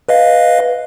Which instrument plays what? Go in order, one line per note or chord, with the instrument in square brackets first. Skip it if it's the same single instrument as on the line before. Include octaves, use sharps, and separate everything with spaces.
[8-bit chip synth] B4 D#5 F5